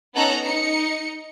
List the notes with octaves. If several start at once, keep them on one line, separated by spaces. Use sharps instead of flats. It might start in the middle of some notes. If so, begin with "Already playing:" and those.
B3 C#4 D#4 A4 A#5 F#6
D#4 C#7